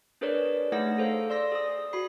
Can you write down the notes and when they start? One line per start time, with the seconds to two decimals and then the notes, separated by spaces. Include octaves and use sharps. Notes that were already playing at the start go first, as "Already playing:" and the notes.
0.21 D4 G#4 A#4 B4 C#5 D5
0.72 A3 D#4 G#4 F#5 A#6
0.98 A4 C5 F5
1.30 D5 C6 E6 A#6
1.52 G#4 D#6
1.93 F#4 B5 C7